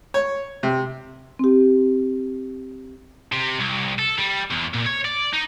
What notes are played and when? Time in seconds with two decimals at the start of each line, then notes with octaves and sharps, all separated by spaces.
0.14 C#5
0.63 C3
1.39 C4 G4
3.32 C3
3.59 C2
3.99 A4
4.19 G3
4.51 E2
4.75 A#2
4.87 C#5
5.05 D5
5.33 D#4